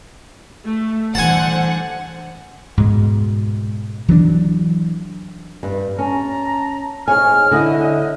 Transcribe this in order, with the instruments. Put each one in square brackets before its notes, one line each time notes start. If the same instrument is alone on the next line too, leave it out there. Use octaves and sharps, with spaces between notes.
[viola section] A3
[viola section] D3 C5 [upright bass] E3 G3 [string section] F#5 [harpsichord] G#5 A5
[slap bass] G#2 B2 G#3
E3 F#3 B3 D4
[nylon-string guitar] G2
[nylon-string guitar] C#4 [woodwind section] A5 A#5
[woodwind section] G#2 F6 [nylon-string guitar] G#4 C#5 G#5
[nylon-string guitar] D3 E4 F#5 [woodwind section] C#5 D#5